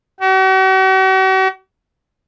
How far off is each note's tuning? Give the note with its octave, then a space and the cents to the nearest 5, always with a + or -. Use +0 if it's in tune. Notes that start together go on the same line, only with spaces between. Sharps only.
F#4 +45